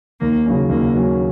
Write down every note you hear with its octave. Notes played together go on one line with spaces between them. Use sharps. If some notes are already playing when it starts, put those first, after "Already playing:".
D#2 A#3
C#3 F#3 C#4
D#2 A#3
C#3 F#3 C#4